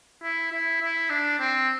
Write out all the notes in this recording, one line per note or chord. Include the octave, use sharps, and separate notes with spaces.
E4
E4
E4
D4
C4